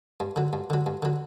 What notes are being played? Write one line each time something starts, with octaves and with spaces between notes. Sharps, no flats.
G2
D3 F#3
G2
D3 F#3
G2
D3 F#3